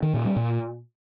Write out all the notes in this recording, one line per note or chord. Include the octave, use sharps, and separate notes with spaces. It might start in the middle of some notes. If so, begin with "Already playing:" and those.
D#3
A#2
G3
A#2